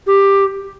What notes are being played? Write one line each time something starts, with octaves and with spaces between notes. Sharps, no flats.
G4